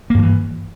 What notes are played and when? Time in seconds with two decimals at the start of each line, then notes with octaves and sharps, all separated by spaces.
0.10 A#3
0.14 G2
0.18 F3
0.23 E3